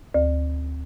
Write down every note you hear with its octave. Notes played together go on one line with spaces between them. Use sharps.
D2